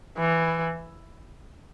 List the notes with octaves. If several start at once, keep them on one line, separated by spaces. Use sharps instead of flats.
E3